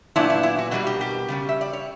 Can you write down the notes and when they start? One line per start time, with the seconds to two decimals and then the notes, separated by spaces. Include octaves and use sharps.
0.16 A#2 F#3 B3 D4 E4
0.30 E4
0.43 E4
0.58 F#4
0.71 B2 G3 A#3 F#4
0.87 G4
1.01 G4
1.28 C#3 G3 C#4
1.49 E5
1.61 D5
1.73 C#5